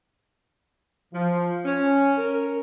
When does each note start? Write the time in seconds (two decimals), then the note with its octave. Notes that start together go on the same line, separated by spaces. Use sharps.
1.13 F3
1.65 C#4
2.17 A#4